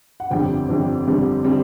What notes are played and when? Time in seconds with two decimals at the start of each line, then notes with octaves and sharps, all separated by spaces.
0.20 F#5
0.30 G1 F2 D3 G3 C4 G5
0.69 G1 F2 D3 G3 C4
1.07 G1 F2 D3 G3 C4
1.44 D3 G3 C4